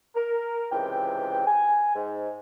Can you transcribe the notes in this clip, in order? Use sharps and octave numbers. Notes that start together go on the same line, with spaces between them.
A#4
C#2 C3 E3 G5
G#5
G#2